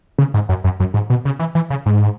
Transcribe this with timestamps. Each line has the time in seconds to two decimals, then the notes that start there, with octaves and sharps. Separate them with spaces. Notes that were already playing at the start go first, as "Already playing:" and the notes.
0.18 C#3
0.34 G#2
0.49 F#2
0.64 F#2
0.80 F#2
0.94 G#2
1.10 B2
1.25 C#3
1.39 E3
1.55 E3
1.70 C#3
1.86 G#2